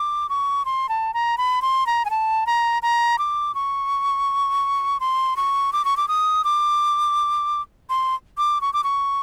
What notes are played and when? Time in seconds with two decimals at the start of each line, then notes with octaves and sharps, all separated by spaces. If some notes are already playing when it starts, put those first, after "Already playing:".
Already playing: D6
0.29 C#6
0.65 C6
0.89 A5
1.14 A#5
1.38 B5
1.62 C6
1.87 A#5
2.05 G#5
2.10 A5
2.47 A#5
2.83 A#5
3.18 D6
3.55 C#6
5.00 C6
5.37 C#6
5.73 D6
5.85 C#6
5.97 D6
6.08 D#6
6.44 D6
7.90 C6
8.38 D6
8.61 C#6
8.73 D6
8.84 C#6